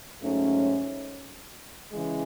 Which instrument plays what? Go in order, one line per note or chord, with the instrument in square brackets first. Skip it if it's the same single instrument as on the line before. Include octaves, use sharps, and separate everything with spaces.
[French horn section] G#2 F#3 A3 C#4
C#3 E3 G#3